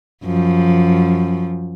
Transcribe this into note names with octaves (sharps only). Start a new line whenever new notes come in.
F#2 F3